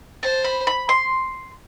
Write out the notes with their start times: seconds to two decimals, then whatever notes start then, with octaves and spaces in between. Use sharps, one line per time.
0.23 C5 A5
0.44 B5
0.67 B5
0.89 C6